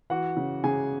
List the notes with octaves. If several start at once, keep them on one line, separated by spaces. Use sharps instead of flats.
E3 F#4 F#5
C#3
C#3 G#4 G#5